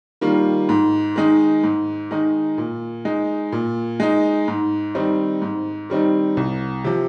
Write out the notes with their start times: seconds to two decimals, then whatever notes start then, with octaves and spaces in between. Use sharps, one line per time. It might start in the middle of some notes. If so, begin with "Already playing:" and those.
0.21 D#3 G3 A#3 F4
0.69 G#2
1.16 D#3 G#3 D#4
1.64 G#2
2.11 D#3 G#3 D#4
2.58 A#2
3.05 G#3 D#4
3.52 A#2
4.00 G#3 D#4
4.48 G#2
4.95 D#3 G3 C4 D#4
5.42 G#2
5.90 D#3 G3 C4 D#4
6.37 C2
6.84 C3 F3